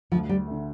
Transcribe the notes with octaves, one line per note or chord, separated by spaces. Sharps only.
D2 F3
G3
D3 A3